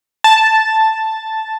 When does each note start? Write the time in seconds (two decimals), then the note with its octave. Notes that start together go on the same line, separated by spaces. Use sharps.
0.24 A5